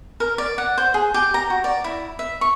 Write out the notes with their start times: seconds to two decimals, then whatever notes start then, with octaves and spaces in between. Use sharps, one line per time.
0.20 A#4
0.38 D5
0.58 F#5
0.78 C5
0.94 G#4
1.14 G4
1.34 A#5
1.50 F#4
1.64 D5
1.84 E4
2.19 E5
2.41 C#6